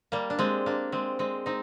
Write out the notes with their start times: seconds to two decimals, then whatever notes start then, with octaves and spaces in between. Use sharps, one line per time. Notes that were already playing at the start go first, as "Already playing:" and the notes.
0.12 G3 A#3
0.30 D4
0.39 G#3 C4
0.66 A#3 D4
0.92 G#3 C4
1.19 G#3 C4
1.46 C4 D#4